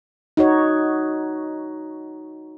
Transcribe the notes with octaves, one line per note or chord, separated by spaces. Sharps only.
D#4 F#4 C#5